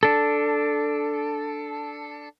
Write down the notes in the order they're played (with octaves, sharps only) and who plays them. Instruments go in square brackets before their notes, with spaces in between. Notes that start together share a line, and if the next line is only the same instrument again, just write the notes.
[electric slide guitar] D4 A4